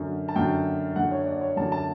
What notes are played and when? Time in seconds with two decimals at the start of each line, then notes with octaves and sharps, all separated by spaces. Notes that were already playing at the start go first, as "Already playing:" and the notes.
Already playing: F#2 D3
0.28 A5
0.36 F#2 D3 G5
0.96 F#2 D3 F#5
1.11 C#5
1.26 D5
1.41 C#5
1.57 F#2 D3 A5
1.72 A5